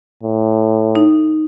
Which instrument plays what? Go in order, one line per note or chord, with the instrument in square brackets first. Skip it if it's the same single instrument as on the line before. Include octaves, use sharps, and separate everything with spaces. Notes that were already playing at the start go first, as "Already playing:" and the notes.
[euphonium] A2
[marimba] D#4